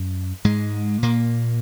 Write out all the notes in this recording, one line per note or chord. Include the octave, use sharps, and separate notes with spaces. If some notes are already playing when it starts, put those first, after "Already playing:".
Already playing: F#2
G#2 G#3
A#2 A#3